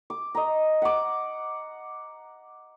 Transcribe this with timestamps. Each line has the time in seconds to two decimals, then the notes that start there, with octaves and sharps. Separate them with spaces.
0.10 D6
0.35 D#5 A#5
0.82 F#5 D6